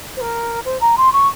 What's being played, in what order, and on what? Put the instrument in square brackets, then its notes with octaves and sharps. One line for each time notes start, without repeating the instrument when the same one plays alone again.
[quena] C5
A#4
C5
A#5
C6
C#6